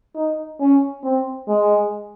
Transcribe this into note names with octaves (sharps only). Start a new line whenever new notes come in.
D#4
C#4
C4
G#3